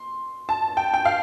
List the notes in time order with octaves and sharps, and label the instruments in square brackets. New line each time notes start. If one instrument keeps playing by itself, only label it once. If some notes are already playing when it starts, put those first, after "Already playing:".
Already playing: [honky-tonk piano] C6
A5
G5
G5
F5